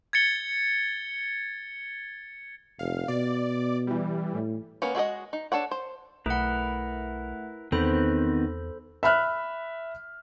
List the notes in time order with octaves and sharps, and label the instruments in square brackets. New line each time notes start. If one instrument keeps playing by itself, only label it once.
[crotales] G#6 A6 C#7 G7
[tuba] F1 [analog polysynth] F5
[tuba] B2 [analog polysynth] D5
[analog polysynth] E3 G3
[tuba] A2
[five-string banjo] A#3 B3 C#4
G#3 F#4 A4 D#5
D#4
D4 A4 C#5 F#5
C5
[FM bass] B1 [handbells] A3 F#5 [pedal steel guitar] E4 A#4 B4
[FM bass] E2 [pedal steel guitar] D#3 B3 C4 [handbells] A4 C5 B5
[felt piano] E5 B5 F6 F#6